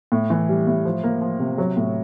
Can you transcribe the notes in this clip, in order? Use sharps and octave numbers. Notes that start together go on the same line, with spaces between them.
A2
E3
G3
A2
F3
A#3
F3
C3
F#3
A2